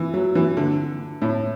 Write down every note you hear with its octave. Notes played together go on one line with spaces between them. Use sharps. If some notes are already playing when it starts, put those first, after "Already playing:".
Already playing: E3
F#3
E3
D3
A2